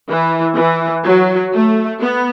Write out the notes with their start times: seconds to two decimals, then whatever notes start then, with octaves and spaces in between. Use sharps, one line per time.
0.09 E3
0.57 E3
1.05 F#3
1.54 A3
2.02 B3